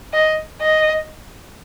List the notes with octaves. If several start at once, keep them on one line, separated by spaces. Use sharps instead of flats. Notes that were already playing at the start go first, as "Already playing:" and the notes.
D#5
D#5